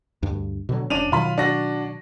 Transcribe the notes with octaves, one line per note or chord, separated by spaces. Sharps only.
D2 G2
B2 D3 F#3
E1 C#4 D4 D#7 F7
B2 D#3 F#3 F4 B5
D4 F#4 A#6